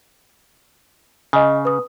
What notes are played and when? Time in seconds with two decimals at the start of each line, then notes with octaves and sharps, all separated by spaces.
1.33 C#3 D#5 G#5
1.65 B4 D#6